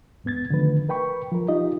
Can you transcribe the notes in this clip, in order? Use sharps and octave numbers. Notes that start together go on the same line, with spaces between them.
E2 G#2 B3 G#6 A6
D3 D#3 F3 A3 B4
A#4 B4 G5 B5 C#6
F3 A#4
D#4 F4 G4 D#5